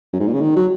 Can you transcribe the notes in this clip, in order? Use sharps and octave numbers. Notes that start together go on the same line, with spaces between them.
F#2
G#2
A#2
C#3
D#3
F#3